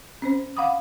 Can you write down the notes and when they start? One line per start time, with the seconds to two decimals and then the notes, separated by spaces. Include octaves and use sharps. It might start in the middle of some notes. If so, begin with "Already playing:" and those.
0.22 C4 C#4 C5
0.57 F5 F#5 B5 D6 D#6